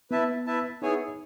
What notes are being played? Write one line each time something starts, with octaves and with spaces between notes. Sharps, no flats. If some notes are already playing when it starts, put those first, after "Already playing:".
B3 E4 B4 E5 A5
E4 B4 E5 A5
B3 D#4 E4 G#4 C#5 G#5